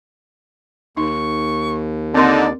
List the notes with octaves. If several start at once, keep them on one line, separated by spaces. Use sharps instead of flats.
D#2 D#4 C#6
D3 C4 D#4 A#4 D5 C6